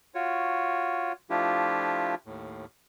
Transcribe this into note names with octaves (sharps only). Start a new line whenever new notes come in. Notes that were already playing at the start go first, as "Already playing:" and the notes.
F4 F#4 C#5
F3 A3 D4 E4 F4 G4
D#2 A2